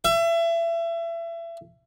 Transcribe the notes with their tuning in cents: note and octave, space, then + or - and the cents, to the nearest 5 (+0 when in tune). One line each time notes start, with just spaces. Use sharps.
E5 +30